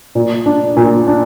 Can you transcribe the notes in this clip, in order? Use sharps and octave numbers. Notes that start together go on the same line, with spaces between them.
A#2
D4
A#2
D4